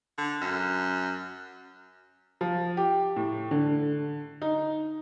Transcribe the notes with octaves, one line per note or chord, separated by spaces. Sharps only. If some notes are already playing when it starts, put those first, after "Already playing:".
D3
F#2
F3
G4
A2
D3
D#4